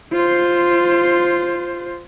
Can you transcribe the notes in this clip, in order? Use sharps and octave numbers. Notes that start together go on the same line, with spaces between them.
F4 C5